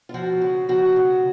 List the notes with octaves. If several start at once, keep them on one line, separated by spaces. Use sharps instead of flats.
F4
F3 F#4
C#3
F3 F#4
C#3